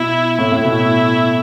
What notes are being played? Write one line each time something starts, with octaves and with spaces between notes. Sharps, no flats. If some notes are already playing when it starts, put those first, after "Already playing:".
Already playing: B2 E4
A2 E4
A2
B2